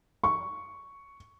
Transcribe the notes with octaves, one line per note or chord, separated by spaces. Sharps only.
C#6